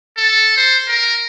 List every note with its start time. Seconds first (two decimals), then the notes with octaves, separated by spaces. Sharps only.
0.17 A4
0.57 C5
0.88 A#4